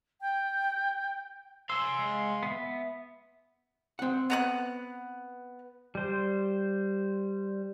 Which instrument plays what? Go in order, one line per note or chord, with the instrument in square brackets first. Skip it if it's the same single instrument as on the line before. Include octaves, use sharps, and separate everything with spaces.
[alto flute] G5
[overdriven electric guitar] F5 G#5 [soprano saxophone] C6 [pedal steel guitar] E6
[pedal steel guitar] G#3
B3 E5
[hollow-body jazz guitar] C4 F#5
[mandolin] B3 A#5 F#6
[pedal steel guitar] G3 C5